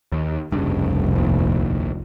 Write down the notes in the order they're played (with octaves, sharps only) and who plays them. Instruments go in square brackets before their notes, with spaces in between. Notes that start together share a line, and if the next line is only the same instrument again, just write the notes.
[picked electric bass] D#2
[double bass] F1 C2 [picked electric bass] G2 C#3
[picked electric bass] A#1 D#2